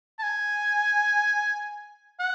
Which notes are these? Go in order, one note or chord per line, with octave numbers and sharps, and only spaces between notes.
A5
G#5
F#5